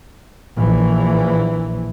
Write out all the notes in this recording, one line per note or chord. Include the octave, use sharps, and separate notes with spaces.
A#1 E3